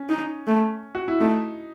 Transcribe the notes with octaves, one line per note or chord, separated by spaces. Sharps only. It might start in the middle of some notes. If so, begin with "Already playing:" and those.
Already playing: C#4
D#4
A3
F#4
E4
A3 D#4